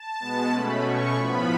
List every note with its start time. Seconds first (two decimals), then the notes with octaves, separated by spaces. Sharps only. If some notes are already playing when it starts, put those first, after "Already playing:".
Already playing: A5
0.20 B2 G#3 B3
0.51 B2 A3 C#4 B5
0.82 B2 A3 C#4 C#6
1.13 A2 F3 B3 B5